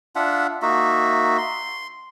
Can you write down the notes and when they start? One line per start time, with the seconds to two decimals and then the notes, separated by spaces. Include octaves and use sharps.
0.16 D4 F4 E5 F#5
0.62 A#3 D#4 F#4 E5
1.38 C6